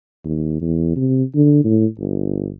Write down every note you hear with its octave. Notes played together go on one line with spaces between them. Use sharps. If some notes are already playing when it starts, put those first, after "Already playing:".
D#2
E2
C3
D3
A2
G1